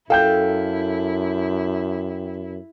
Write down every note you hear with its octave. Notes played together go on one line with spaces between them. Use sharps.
F#2 E4 A4 F5 G5 G6